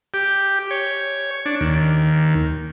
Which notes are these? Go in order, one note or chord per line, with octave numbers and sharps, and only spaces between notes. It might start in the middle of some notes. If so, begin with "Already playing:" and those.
G4
C#5
D4
D#2